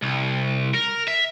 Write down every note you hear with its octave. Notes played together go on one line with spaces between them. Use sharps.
C2
A#4
E5